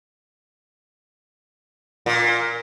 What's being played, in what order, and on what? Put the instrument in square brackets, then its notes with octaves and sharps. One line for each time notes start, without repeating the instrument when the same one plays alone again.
[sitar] A#2